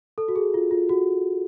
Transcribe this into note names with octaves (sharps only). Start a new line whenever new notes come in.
A4
F#4
G#4
F4
F4
F#4